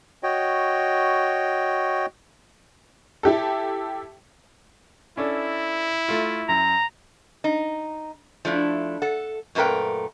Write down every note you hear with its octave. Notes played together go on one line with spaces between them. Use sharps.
F#4 C#5 D#5 G5
E4 G4 A4
C#4 D4 E4 A4
A3 F4
F#2 A#5
D#4
F3 A3 D4 E4
A4 F#5
F#2 A#2 A3 A#4 B4 G5